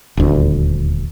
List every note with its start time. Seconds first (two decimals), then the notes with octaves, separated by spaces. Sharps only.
0.17 D#1 D2